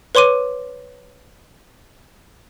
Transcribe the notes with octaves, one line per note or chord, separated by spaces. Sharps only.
B4 C#5 C6 D6 D#7